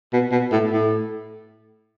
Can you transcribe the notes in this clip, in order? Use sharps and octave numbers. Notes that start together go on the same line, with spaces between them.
B2
B2
A2
A2